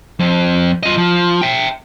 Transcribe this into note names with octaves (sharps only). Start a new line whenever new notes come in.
F2
F4 D#5
F3
E5 G5